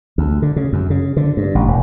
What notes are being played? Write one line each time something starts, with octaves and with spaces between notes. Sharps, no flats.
D2
D3
C#3
F#2
C#3
D3
G2
A1
E1